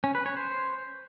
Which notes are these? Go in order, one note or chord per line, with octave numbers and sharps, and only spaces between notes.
C#4
B4
C#5
C5